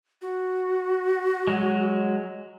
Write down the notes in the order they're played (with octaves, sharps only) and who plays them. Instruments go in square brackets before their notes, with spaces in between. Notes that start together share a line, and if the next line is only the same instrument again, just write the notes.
[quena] F#4
[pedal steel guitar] F#3 G#3